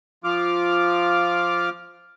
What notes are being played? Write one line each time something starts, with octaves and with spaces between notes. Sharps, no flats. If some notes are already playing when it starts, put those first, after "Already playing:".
F3 F4 D6 F6